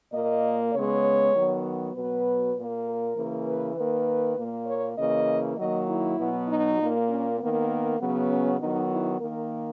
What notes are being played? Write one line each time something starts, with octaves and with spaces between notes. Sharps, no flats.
A#2 A#3 D#5
C#3 G#3 B3 C#5
D#3 F#3 B3
B2 F#3 B3 B4
A#2 A#3
A#4
C#3 E3 A#3
B4
D#3 A#3 B4
A#2 A#3
C#5
C#3 E3 A#3 D#5
D#3 F#3 A#3 D#5
E4
B2 F#3 B3
D#4
A#2 A#3
C#4
D#3 A#3 B3
C#3 F#3 B3
C#4
D#3 F#3 B3 D#4
E4
D#3 A#3 A#4